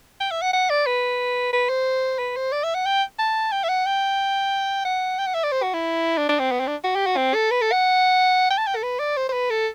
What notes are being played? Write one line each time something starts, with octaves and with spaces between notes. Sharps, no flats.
G5
E5
F#5
F#5
D5
B4
B4
C5
B4
C5
D5
E5
F#5
G5
A5
G5
E5
F#5
G5
F#5
G5
F#5
E5
D5
C5
F#4
E4
D4
D4
C4
B3
C4
D4
F#4
G4
F#4
C4
A4
B4
A4
F#5
G5
A5
G5
A4
B4
D5
C5
C5
B4
A4